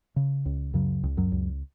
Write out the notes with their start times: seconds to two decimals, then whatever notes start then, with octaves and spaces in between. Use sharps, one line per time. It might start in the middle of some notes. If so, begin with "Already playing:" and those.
0.16 C#3
0.46 C#2
0.74 F#2 C#3 F#3
1.03 C#2
1.17 F#2 F#3
1.32 C#2